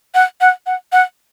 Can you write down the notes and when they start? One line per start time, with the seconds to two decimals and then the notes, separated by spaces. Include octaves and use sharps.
0.15 F#5
0.41 F#5
0.66 F#5
0.92 F#5